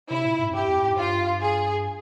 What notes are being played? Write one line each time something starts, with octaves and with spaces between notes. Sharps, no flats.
C3 E4
A#2
G#2
F2
G2 G4
F2
G#2
G2 F4
G#4